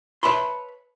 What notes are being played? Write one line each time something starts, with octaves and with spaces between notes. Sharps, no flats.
B4 C#5 E5 A5 B5 C6